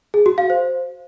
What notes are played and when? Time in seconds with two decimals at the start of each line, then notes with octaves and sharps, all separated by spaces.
0.14 G#4
0.26 F#4
0.38 F5
0.50 C5